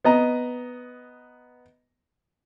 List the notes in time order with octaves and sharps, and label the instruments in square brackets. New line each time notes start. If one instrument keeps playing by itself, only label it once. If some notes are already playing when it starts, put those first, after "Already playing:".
[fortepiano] B3 D#5 A#5